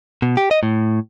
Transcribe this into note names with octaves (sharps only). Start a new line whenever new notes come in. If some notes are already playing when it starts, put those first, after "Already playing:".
B2
G4
D#5
A2